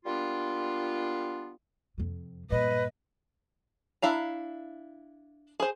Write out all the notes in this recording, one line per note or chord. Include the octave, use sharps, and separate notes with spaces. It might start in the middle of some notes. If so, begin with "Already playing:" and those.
G3 A#3 B3 D4 F4
F2 C3
G2 A#2 B4 D#5
D4 E4 F5 A#5
G#4 C5